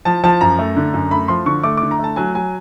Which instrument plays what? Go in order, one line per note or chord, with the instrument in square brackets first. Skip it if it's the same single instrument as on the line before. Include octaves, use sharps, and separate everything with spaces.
[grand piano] F3 A5
F3 A5
F#2 A#5
A3
D3
F#2
A3 B5
F3 C6
D3 C#6
A3 D6
D3 D6
A#5
A3 A5
F#3 G#5
F#3 G#5